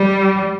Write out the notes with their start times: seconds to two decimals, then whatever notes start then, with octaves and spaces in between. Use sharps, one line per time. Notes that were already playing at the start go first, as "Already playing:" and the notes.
Already playing: G3